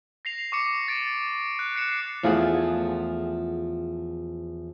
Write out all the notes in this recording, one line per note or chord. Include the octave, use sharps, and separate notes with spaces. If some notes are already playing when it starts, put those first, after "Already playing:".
A#6 C7 F7
C#6 D6 C#7 F7
A6 D7
F#6
F#6 C7 C#7 E7
E2 F3 A3 F4 G#4 F#5